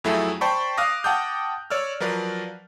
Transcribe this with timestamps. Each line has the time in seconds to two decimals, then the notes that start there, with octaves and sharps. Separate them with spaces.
0.04 F2 F#3 A3 E4 G#4 A4
0.41 C5 D5 G5 A5 B5 C#6
0.77 F5 D6 D#6 F6 F#6 A#6
1.04 F#5 G5 A5 D6 D#6 G6
1.70 C#5 D5 E6 F6
2.00 F3 F#3 A#4 B4 D5